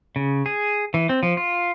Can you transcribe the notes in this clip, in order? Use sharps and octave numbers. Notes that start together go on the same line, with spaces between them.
C#3
G#4
E3
C4
F3
F4